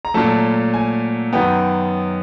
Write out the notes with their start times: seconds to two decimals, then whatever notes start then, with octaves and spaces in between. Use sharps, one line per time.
0.05 A#5
0.14 A#2 F#3 A3 A5
0.74 G#5
1.33 F#2 D#3 F#3 B3 G5